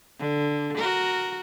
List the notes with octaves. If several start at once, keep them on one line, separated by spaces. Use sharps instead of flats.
D3
F#4 A#4